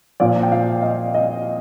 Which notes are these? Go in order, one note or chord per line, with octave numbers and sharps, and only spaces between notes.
A#2 F3 D5
G5
F5
D#5
D#5